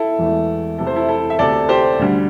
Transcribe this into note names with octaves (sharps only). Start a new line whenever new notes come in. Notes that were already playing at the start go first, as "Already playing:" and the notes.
Already playing: E4 A4
E1 E2 E3 A3
E2 C3 A3 A4
C5
E4 A4
E4 A4
E5
D2 C3 A3 A4 D5
G4 C5
D2 D3 G3